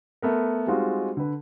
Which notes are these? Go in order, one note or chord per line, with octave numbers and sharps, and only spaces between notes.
A3 B3 A#4
G3 G#3 C4 D#4 F4 F#4
D3 B4